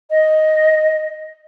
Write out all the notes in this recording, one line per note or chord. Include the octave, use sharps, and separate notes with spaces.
D#5